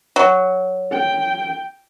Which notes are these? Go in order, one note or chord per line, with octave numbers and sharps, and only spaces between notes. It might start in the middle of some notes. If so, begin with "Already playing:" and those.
F#3
G5